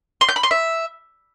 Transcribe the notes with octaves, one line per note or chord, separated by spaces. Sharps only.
C6
G6
B5
C6
E5